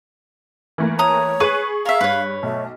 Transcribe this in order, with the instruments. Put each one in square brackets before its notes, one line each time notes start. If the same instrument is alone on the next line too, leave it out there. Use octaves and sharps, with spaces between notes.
[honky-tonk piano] E3 A3 A#3
[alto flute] C#5 [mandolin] A#5 D#6
[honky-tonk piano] G#4 C#6 D#7 [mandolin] B4
[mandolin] A#4 E5 [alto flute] F5
[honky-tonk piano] G2 [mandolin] B4 C#5
[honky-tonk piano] B1 [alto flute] A3